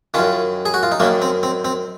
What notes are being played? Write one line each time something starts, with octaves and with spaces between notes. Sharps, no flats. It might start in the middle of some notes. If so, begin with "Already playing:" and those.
F#2 D#3 C#4 F4
G#4
F#4
F4
D#4
F#2 D#3 A#3 C#4
C4
C4
C4